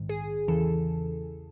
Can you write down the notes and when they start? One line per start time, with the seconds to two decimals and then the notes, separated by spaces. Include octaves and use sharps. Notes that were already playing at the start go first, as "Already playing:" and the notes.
Already playing: A#1 G#2 D#3
0.09 G#4
0.48 E2 C#3 E3 A4